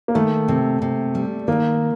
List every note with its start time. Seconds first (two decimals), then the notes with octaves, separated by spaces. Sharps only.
0.08 A#3
0.15 D#3 A3
0.48 C3
0.82 C3
1.15 G3
1.48 D#3 A#3